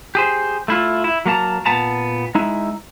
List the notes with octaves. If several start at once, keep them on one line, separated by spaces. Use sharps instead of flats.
G4 G#4 C5
A3 E4 F4
E4
F#3 A#3 A#4 A5 A#5
A#2 B3 A5 A#5
G#3 D#4 E4